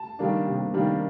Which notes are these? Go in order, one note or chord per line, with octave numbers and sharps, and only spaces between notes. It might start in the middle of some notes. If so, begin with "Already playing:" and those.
Already playing: A5
D#3 G3 A#3 D4
C3
D#3 G3 A#3 D4